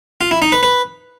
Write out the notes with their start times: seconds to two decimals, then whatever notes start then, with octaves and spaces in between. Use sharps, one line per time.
0.21 F4
0.31 E4
0.42 D#4
0.52 B4
0.63 B4